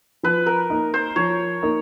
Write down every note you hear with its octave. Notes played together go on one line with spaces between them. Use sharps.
F3 B4
A#4
A#3 D#4
C5
F3 C#5
A#3 D#4